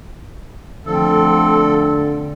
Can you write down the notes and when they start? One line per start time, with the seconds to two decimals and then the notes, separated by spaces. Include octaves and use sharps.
0.86 D3 F3 A3 C4 A4